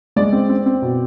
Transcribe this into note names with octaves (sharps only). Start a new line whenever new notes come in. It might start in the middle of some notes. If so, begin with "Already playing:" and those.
G#3 D5
C4
C4
C4
B2